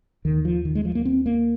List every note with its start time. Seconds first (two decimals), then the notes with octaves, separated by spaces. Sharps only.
0.25 D#2 D#3
0.45 F3
0.65 D#3
0.75 G#3
0.85 F3
0.95 A#3
1.05 C4
1.26 A#3